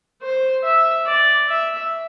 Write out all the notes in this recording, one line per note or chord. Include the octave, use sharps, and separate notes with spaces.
C5
E5
D5
E5